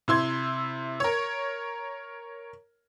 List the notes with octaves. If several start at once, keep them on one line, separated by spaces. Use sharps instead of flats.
C3 E4 C6 G#6
A#4 C#5